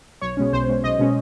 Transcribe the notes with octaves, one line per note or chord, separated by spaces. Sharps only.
B1 C#5
B2 G#3 C#4
B1 C5
B2 G#3 C#4
B1 D#5
B2 G#3 C#4